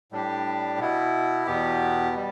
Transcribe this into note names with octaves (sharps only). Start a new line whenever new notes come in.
A2 G3 D4 G4
B2 B3 E4
E2 B2 B3 G4
G3